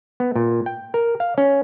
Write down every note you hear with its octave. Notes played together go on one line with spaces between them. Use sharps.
B3
A#2
G5
A#4
F5
C#4